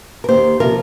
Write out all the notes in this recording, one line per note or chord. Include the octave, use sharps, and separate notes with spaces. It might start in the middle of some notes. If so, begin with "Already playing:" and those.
A#4
D#2 D#3 A#3 G4 C5
C3 F3 A#3 F4 A#4